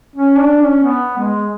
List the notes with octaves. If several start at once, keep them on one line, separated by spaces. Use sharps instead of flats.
C#4
D4
C#4
B3
G#3